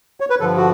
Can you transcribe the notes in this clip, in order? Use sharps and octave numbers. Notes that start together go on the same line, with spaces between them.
C#5
B4
G2 D3 F3 A4
F#4